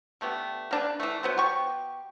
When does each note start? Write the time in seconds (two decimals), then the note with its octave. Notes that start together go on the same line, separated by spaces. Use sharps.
0.21 D3 A3 B3 G4
0.71 A#3 D4 B4
1.00 E3 A3
1.23 F#3 B3 C5
1.38 B2 G4 C#6